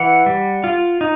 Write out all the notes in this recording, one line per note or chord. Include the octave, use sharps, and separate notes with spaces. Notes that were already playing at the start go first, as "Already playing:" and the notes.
Already playing: E3 F#5
G3
F4
D#4